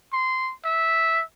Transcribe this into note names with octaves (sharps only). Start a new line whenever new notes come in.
C6
E5